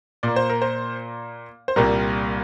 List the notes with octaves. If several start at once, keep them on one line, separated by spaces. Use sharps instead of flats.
A#2 A#3 D5
C5
A#4
C5
C5
C2 A#2 G3 A#3 A#4